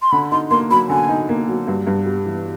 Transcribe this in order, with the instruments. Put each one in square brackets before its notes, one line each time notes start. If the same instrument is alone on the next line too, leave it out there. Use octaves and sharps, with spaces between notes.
[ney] C6
[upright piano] D3 [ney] B5
[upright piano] D#4 [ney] C6
[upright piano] A#3 [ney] C6
[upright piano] F#3 [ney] B5
[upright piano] D3 [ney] G#5
[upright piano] D#4
A#3
F#3
G2
G2
G3
E3